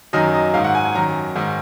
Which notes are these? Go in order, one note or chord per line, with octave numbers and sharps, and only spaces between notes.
F#2 D#3 D#5
D#5
G#2 D#3 F5
F#5
G#5
G#5
F#2 D#3 A#5
G#2 D#3